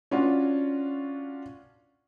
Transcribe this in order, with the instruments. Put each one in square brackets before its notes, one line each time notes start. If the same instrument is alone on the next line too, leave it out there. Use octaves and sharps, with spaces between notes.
[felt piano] C#4 D4 F4 F#4